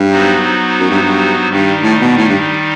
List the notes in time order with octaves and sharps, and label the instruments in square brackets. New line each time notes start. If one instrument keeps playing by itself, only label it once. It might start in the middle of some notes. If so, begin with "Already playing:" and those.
Already playing: [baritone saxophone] G2
[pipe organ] F#3 B3 D#4 F#4 C5
[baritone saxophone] F#2
G2
G2
[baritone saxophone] G2 [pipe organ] D#3 G3 D#4
[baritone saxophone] A2
B2
A2
G2